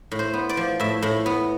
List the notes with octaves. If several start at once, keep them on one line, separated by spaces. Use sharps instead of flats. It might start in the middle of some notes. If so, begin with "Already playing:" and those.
A2
C5
B3
D5
F3
A2 E5
A2
B3